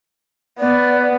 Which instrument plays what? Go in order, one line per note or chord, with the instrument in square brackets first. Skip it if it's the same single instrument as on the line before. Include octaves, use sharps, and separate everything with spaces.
[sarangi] B3 [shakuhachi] D5